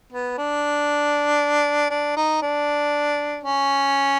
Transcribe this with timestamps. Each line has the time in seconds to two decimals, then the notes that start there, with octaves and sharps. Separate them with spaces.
0.12 B3
0.38 D4
1.90 D4
2.17 D#4
2.42 D4
3.44 C#4